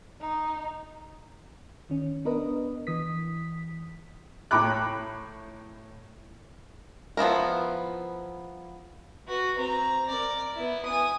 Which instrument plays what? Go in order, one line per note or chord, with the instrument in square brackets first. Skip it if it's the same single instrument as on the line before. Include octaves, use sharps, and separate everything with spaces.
[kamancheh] D#4
[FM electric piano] D#3 C#4
B3 D4 A#4 B4 D#5
E3 D#6 B6
[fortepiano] A2 G5 A#5 B5 D6 F#6
[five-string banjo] F3 B3 E4 A#4
[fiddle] F#4 B4
C4 A#5
A#4 D5
B3 E4
G#5 D#6